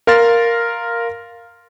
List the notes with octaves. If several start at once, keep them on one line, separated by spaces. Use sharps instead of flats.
A#4 F5 C6 F6 A6